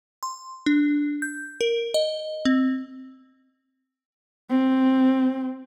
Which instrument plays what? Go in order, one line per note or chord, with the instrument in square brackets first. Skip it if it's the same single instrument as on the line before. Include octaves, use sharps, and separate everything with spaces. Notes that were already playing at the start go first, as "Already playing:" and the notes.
[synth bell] C6
D4
G6
A#4
D#5
C4
[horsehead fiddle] C4